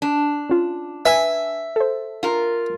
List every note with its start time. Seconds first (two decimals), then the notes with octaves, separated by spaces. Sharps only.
0.02 D4
0.50 C#4 F4
1.06 B4 E5 G#5 E6
1.76 A4 C5
2.23 F4 A#4